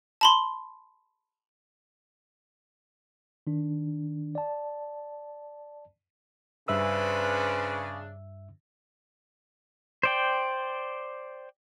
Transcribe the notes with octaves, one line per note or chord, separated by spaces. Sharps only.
A5 B5 C6
D#3 D4
D5 A5
G2 C#3 D4 B4 C5 E5 E6
C5 D5 G5